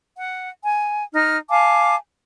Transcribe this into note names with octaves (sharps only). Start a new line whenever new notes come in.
F#5
G#5
D#4 F6
F5 G#5 A5 D6